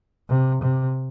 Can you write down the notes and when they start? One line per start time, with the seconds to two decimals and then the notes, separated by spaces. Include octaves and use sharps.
0.29 C3
0.63 C3